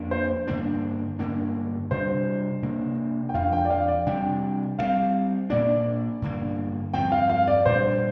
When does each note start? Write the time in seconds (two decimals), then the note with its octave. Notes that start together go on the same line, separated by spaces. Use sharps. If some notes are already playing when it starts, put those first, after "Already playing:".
Already playing: F2 F3 A#3 D4
0.11 C5
0.48 G2 D3 A#3 D4
1.19 G2 D3 A#3 D4
1.91 C3 G3 D4 C5
2.62 C3 A#3 D4
3.29 G5
3.34 F2 F3 D4 F5
3.53 G5
3.65 D5
3.70 F5
3.88 D5
4.06 C3 G3 D4 G5
4.79 G2 G3 C4 F5
5.50 A#2 A#3 D4 D5
6.22 G2 D3 A#3
6.94 G2 F3 C4 G5
7.12 F5
7.30 F5
7.48 D5
7.66 A#2 G3 D4 C5